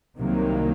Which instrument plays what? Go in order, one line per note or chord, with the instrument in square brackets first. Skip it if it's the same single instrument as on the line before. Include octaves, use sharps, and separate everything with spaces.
[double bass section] C2 C3 D#3 F#3 A#3